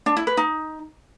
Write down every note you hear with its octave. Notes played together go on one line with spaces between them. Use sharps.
D4
E4
B4
D#4